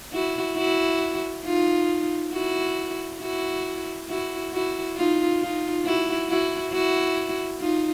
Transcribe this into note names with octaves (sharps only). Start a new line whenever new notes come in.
E4 F#4
E4 F#4
D#4 F4
E4 F#4
E4 F#4
E4 F#4
E4 F#4
D#4 F4
D#4 F4
E4 F#4
E4 F#4
E4 F#4
D#4 F4